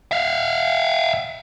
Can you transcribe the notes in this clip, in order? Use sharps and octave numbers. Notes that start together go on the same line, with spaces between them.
E5 F5